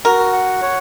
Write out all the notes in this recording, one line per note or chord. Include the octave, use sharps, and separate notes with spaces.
F#4 A#4
F#5
C#5